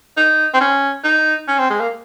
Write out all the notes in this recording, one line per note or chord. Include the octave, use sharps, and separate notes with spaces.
D#4
C4
C#4
D#4
C#4
C4
G#3
A#3